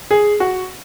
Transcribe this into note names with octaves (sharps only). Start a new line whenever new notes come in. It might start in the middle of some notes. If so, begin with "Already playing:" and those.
G#4
F#4